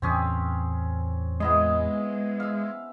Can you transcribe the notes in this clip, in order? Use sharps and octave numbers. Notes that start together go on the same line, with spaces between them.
E2 A2 E3 C4 C#4 G#4
G#3 B3 E4 D#5
E5 F5